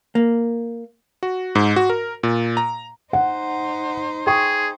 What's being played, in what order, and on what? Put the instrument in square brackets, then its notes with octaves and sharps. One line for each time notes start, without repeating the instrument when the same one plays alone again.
[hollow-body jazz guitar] A#3
[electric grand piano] F#4
G#2
F#4
A#4
A#2
A#5
[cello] D#4 C5 [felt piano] F#5
[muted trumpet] G#4 [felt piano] G5 C#6 D#6